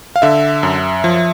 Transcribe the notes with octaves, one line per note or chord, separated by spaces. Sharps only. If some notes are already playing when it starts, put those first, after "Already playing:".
F5
D3 E5
F#2
F3